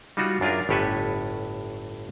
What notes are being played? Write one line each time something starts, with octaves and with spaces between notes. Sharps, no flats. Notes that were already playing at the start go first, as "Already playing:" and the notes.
G3 D#4 F4 F#4
F#2 D4 F4 G#4 A#4
G1 A2 G4 A4 B4 G#5